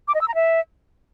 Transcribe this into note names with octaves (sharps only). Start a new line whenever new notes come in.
D6
D#5
E6
A#5
E5